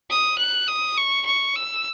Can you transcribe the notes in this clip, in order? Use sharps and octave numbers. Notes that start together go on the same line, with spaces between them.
D#6
F#6
D#6
C#6
C#6
E6